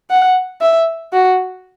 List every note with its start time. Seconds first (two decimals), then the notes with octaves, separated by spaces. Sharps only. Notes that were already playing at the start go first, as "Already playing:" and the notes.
0.10 F#5
0.61 E5
1.13 F#4